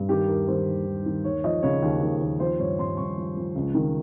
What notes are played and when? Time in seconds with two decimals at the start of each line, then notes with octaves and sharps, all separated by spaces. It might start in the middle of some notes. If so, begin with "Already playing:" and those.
Already playing: G2
0.09 D#3 G4
0.28 D#2 A#4
0.47 D#3 C5
0.67 D#2
0.85 D#2
1.05 D#3
1.24 D#2 C#5
1.44 F3 D#5
1.63 C#3 C#5
1.82 D#2
2.01 D#2
2.21 D#2
2.40 F3 C5
2.59 G2 C#5
2.79 G2 C6
2.97 G2 C#6
3.17 F3
3.37 F3
3.56 C#2
3.74 D#3